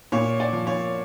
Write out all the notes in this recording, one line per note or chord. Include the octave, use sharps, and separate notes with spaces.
A#2 C#5
D5
F3
C#5